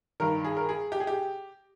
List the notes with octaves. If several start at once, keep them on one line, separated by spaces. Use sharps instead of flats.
G2 D#3 A#4
G#4
A#4
G#4
G4
G#4
G4